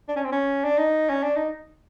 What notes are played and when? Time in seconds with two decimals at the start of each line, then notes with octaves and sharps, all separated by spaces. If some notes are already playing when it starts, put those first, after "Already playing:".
0.09 D4
0.16 C#4
0.24 C4
0.32 C#4
0.64 D4
0.79 D#4
1.09 C#4
1.23 D4
1.36 D#4